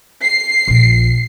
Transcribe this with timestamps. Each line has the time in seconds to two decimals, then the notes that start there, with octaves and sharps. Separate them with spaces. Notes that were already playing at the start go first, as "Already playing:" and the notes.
0.24 C7
0.68 A#1 A#2